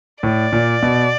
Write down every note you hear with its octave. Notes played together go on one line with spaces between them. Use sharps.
A2 D5
A#2
B2